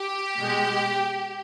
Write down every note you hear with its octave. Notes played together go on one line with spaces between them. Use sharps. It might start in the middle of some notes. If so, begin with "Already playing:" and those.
Already playing: G4
B2 G#3